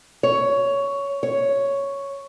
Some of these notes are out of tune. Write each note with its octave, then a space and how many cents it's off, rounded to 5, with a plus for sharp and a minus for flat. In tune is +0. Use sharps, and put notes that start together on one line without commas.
C#5 +10
C#5 +0